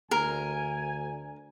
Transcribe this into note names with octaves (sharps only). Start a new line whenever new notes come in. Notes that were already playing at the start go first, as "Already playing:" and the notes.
D2 A#4 G#5